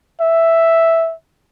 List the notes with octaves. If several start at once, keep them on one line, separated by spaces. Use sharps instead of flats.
E5